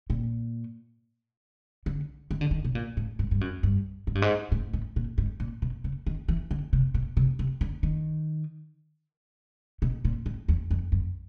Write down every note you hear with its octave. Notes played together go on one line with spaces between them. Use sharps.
A#2
D3
D#3
D3
D#3
B2
A#2
A2
G#2
G2
F#2
G2
G#2
G2
G#2
A2
A2
A#2
G#2
A#2
B2
C#3
D#3
E3
D3
C3
B2
C3
C3
D3
D#3
B2
A#2
A2
E2
F2
F#2